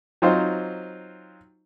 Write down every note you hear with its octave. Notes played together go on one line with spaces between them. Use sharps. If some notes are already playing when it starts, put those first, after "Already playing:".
F#3 C4 D#4 F4 C5